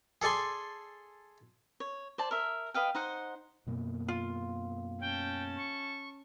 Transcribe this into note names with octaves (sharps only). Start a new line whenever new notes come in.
G#4 A4 D5 G#5 C6
C#5
C5 D5 A5
A#4 E5
B4 D#5 F5 G5
D#4 C5 F#5
F#2 B2 A#3
F4
C#4 G5 A5
C#6